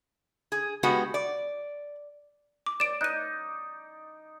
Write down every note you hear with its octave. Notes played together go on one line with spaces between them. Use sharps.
G#4
G#3 B3 F#4 G4
D5
D6
D5 D7 E7
D#4 F#6 D#7